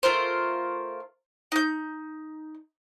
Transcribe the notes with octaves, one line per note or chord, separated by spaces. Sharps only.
A3 F4 A#4 C5
D#4 G6